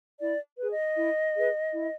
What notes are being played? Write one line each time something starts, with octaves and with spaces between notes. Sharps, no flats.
E4 D5
G#4 B4
D#5
E4
G#4 B4
E4